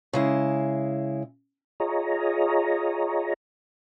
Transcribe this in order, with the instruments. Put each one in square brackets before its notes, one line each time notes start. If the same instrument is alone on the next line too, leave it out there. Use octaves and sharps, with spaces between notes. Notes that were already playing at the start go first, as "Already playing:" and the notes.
[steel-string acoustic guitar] C#3 G#3 E4
[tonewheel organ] F4 G#4 C#5 D#5 A#5